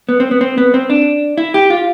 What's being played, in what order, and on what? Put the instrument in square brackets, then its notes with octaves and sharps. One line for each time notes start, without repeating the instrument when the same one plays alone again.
[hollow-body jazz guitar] B3
C4
B3
C4
B3
C4
D4
E4
G4
F4